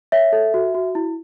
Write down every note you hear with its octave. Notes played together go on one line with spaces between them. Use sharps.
C#5 E5
A4
F#4
F#4
E4